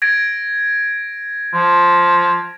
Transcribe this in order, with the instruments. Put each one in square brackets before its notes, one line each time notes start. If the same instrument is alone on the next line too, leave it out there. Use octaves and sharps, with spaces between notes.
[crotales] G#6 A#6 D7
[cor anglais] F3